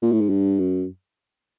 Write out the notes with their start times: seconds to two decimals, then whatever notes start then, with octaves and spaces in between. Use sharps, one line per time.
0.02 A#2
0.12 A2
0.21 G#2
0.29 G2
0.59 F#2